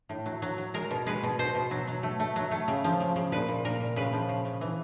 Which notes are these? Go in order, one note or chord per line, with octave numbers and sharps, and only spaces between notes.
A2
F#3
F#3
F#3
G#3 A#4
B2
G#3 B4
B2
B2 C5
B2
F#3
F#3
A3
A3
F#3
A3
C#3
F3
C#3
C#3
A#2 B4
A#2
A#2 A#4
A#2
C#3 B4
F3
C#3
C#3
E3